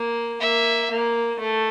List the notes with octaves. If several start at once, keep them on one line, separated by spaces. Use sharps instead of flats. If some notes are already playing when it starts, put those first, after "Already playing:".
Already playing: A#3
A#3 E5
A#3
A3